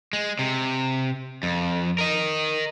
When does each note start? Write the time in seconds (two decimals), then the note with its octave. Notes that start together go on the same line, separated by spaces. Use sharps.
0.13 G#3
0.39 C3
1.43 F2
1.99 A#4 D#5